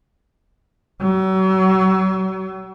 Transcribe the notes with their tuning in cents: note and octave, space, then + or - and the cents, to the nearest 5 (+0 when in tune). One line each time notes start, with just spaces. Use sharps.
F#3 +40